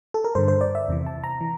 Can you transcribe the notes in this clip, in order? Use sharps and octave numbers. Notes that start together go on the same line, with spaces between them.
A4
A#4
G2 D3 C5
C5
D5
E5
E2 C3 E3
A5
A#5
E3